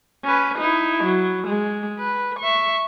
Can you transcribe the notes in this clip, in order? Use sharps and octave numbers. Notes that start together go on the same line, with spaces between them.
C#4 B4
D#4 E4
F#3
G#3
B4
E5 C#6